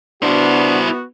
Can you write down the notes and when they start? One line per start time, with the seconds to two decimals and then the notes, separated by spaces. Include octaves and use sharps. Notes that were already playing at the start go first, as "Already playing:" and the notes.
0.22 B3 D4 E4 F#4 C5